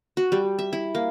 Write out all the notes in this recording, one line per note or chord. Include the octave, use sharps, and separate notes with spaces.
F#4
G3
E5
E4
A#3